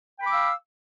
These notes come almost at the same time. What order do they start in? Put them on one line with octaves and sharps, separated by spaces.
G5 B5 D6 E6 F5